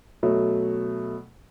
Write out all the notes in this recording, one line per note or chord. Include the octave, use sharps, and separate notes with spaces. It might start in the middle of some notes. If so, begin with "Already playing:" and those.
B2 F#3 A3